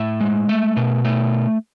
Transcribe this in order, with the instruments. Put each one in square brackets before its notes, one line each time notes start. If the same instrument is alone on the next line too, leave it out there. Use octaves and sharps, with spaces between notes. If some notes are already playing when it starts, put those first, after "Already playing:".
Already playing: [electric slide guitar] A2 E5
G#3
A3
B2
A3